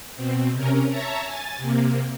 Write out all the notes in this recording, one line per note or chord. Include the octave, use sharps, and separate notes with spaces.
B2 C4
C3 C#4 A#4
C#5 E5 A5 A#5
G#5 A6
C3 A#3